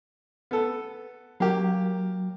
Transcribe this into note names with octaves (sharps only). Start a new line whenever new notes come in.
B3 A4
F#3 A#3 G4